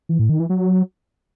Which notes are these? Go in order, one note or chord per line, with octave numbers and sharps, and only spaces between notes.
E3
A2
D#3
E3
F#3